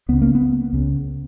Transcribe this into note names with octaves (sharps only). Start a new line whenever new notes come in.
C#2 C#3 B3
A#3
B3
C#2 C#3